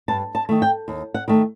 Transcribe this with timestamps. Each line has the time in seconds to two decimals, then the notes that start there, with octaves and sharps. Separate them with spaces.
0.08 G2 A5
0.35 A5
0.49 D#3 A3
0.62 G5
0.88 D#2
1.14 F#5
1.28 D#3 A3